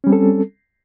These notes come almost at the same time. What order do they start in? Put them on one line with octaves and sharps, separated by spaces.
C#4 G3 C4 A4